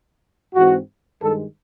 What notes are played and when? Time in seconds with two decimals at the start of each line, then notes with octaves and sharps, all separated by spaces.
0.55 G#2 E3 G#3 C4 F#4
1.21 G2 D#3 G#3 A4